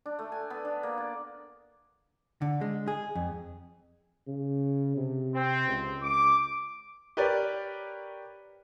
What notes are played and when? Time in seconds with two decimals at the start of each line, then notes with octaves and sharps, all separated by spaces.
0.06 D4
0.19 A3
0.32 G#5
0.50 B3
0.65 D4
0.83 A#3
0.98 D5
2.42 D3
2.61 G#3
2.88 G#4
3.15 F2
4.27 C#3
4.97 C3
5.34 C4
5.68 C#2
6.02 C#2 D6
7.17 G4 A#4 B4 C#5 D5